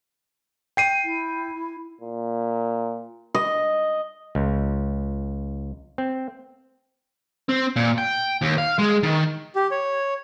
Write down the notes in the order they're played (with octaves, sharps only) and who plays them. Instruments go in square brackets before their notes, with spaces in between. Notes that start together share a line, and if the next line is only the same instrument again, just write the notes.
[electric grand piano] G5 C7 D#7
[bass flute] E4
[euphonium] A#2
[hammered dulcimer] D#5
[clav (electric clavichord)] C#2
C4
[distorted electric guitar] C4
A#2
G5
D#2
F5
G#3
D#3
[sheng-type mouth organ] G4
C#5